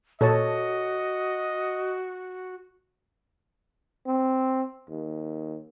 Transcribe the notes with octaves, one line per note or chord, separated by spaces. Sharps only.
A#2 F#4 A4 C#5 D#5 A5
C4
D#2